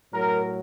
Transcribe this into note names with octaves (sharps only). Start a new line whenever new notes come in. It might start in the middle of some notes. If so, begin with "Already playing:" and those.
A2 F#3 A#4